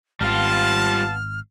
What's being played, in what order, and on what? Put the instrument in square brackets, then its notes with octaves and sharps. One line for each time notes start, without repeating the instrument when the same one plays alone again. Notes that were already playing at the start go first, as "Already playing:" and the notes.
[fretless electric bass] G#1 [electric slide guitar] G3 F4 [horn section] B3 F5 A5 [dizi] F6